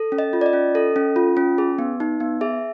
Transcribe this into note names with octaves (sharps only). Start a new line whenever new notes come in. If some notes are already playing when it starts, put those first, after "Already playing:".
Already playing: A4
C#4
D#5
F4
D5
D#5
C#4
A4
C#4
F4
C#4
G#4
B3
D#4
B3
G#4 E5